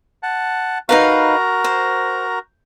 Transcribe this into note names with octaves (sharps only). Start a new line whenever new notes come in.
F#5 A5
D#4 F#4 A#4 B4 F5 A#5
C5